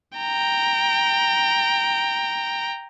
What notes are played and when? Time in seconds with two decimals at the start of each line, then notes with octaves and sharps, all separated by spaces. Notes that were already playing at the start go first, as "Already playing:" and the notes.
0.18 G5 A#5